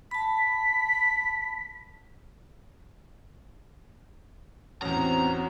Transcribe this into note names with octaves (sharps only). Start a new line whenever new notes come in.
A5 B5 B6
A1 E2 C4 C#4 F#4 A#5